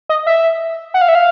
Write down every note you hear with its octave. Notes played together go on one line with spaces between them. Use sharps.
D#5
E5
F#5
F5
E5
F5